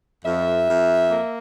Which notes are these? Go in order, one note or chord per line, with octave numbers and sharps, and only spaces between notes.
F2 E5
F2
A#3